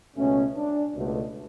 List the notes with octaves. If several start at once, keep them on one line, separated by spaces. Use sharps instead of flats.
C#2 B2 A3 C#4
D4
C#2 B2 A3